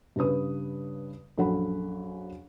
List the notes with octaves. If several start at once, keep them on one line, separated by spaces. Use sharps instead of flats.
G2 C#3 B4 D#6
A#1 F#2 A4 F#5 B5